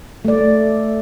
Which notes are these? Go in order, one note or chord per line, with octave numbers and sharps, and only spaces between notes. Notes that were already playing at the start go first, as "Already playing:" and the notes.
A3 D5